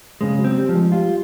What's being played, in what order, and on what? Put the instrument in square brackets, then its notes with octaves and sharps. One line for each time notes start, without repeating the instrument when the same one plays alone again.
[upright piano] C#3 [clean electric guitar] G#3
[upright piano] F#3
[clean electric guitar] C4
[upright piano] G3
[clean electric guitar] F3
[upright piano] G#3
[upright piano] G3 [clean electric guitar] F4